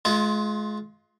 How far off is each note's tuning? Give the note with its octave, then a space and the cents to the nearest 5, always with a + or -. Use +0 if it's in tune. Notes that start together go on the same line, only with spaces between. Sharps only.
G#3 +35 F4 +0